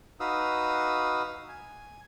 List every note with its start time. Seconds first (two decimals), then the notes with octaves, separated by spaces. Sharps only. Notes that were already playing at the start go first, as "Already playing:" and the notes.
0.20 D#4 F#4 B4 F5 D#6 E6
1.49 G#5